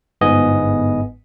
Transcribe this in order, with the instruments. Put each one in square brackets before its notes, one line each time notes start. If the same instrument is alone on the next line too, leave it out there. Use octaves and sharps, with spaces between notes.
[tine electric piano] G1 G#2 B3 D#5 G#5 D#6